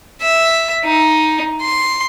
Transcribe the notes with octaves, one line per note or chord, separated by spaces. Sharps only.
E5
D#4
C6